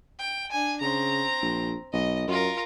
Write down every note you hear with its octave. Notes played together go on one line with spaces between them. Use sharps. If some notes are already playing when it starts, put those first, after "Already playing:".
G5
D4 G#5
C#3 C4 A#5
A#1
B1 D#5
F#2 F4 A#4